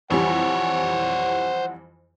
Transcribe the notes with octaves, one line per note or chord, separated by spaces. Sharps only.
F2 E3 G3 C5 C#5 F#5